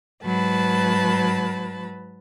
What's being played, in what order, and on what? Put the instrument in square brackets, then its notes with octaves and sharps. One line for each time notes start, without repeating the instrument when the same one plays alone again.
[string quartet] G#2 F#3 B4 A5 B5